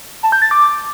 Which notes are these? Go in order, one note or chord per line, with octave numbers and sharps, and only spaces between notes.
A5
G6
A6
D6